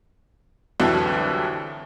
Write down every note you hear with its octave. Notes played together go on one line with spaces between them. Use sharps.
C2 F2 D3 E3 F#3